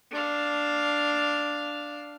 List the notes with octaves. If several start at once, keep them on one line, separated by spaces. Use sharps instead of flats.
D4 F5